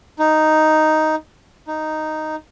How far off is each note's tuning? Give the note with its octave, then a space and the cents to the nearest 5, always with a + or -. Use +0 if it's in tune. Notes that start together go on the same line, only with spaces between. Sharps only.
D#4 +0
D#4 -5